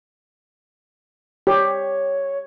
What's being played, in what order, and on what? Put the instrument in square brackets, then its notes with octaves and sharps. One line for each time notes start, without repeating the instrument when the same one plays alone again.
[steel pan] G4 [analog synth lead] C#5